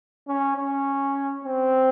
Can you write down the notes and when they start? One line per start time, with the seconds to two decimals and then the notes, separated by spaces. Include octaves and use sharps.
0.28 C#4
0.57 C#4
1.45 C4